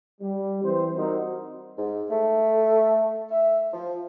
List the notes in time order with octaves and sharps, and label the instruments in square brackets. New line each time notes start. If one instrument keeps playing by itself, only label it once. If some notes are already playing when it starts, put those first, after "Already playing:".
[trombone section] G3
E3 C4 C5
G3 C4 D#4 F#4 A#4 C5
[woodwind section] G#2
A3
E5
F3